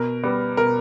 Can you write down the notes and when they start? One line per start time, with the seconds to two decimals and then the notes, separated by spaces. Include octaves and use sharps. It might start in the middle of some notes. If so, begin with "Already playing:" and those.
Already playing: B2 A#4
0.23 G3 B3
0.57 B2 A#4